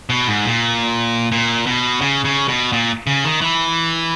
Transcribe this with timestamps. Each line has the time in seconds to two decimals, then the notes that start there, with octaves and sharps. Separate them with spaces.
0.10 B2
0.27 G#2
0.45 A#2
1.32 A#2
1.66 B2
2.01 C#3
2.25 C#3
2.48 B2
2.72 A#2
3.07 C#3
3.24 D#3
3.41 E3